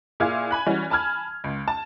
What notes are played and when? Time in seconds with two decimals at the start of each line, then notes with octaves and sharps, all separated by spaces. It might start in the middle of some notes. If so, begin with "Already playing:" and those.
0.20 A#2 E4 G#4 F5 G#6
0.51 G#5 B5 F#6
0.66 E3 G3 C#4 F#4
0.90 G#5 A5 B5 F6 G#6
1.44 C#2
1.68 A5